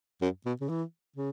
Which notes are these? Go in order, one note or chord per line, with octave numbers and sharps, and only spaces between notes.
F#2
B2
C#3
E3
C#3